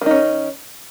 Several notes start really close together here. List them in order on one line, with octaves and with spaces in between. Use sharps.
D#3 D#4 C#4